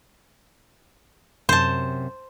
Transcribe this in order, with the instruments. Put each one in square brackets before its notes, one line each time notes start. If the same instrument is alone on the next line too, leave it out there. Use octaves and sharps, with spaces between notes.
[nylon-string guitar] F#2 C3 [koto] C5 A5